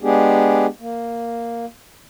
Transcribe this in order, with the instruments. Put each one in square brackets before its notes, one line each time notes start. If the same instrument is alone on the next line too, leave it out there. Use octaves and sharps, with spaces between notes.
[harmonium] G#3 B3 D4 G4 G#4
A#3